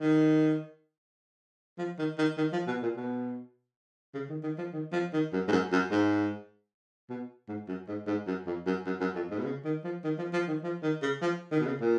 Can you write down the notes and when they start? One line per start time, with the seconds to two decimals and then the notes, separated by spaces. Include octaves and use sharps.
0.01 D#3
1.78 F3
1.99 D#3
2.19 D#3
2.37 D#3
2.53 F3
2.67 B2
2.82 A#2
2.96 B2
4.14 C#3
4.30 D#3
4.43 D#3
4.58 F3
4.73 D#3
4.93 F3
5.13 D#3
5.33 F#2
5.48 G#2
5.52 F#2
5.72 F#2
5.91 G#2
7.10 B2
7.48 G#2
7.68 F#2
7.88 G#2
8.07 G#2
8.27 F#2
8.46 F2
8.66 F#2
8.86 F#2
9.01 F#2
9.16 F2
9.31 G#2
9.39 B2
9.45 C#3
9.65 D#3
9.84 F3
10.04 D#3
10.18 F3
10.33 F3
10.48 D#3
10.63 F3
10.83 D#3
11.02 C#3
11.22 F3
11.52 D#3
11.60 B2
11.66 C#3
11.81 A#2